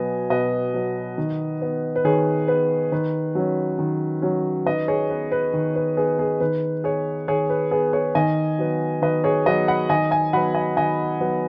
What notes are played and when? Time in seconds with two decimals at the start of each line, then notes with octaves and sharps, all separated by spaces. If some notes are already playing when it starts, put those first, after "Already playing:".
Already playing: B2 F#3 B3 D#5 G#5
0.30 B2 B4 D#5
0.74 F#3 B3
1.18 D#3
1.62 B3
1.96 B4
2.05 D#3 G#4 C#5
2.48 B3 B4
2.92 D#3 B4
3.35 F#3 C#4
3.79 D#3
4.22 F#3 C#4
4.66 D#3 B4 D#5
4.88 G#4 C#5
5.10 B3 B4
5.32 B4
5.53 D#3
5.76 B4
5.97 B3 G#4
6.19 G#4
6.40 D#3 B4
6.84 B3 G#4 C#5
7.28 D#3 G#4 C#5
7.50 B4
7.71 B3 G#4
7.93 G#4 C#5
8.15 D#3 D#5 G#5
8.59 F#3 B3
9.02 D#3 B4 D#5
9.24 G#4 C#5
9.46 F#3 B3 B4 D#5
9.68 F#5 B5
9.89 D#3 D#5 G#5
10.11 D#5 G#5
10.33 F#3 B3 F#5 B5
10.54 D#5 G#5
10.77 D#3 D#5 G#5
11.20 F#3 B3